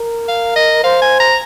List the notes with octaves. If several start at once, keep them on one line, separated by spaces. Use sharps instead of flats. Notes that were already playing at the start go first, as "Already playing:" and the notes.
Already playing: A#4
F5
D#5
C5 F5
G#5
A#5